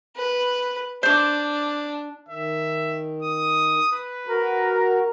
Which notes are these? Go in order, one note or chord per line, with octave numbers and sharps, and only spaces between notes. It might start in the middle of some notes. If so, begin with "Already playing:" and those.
B4
D4 C5 D6
D#3 E5
D#6
B4
F#4 A#4 A#5